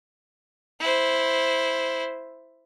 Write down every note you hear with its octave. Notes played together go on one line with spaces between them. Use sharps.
E4 C5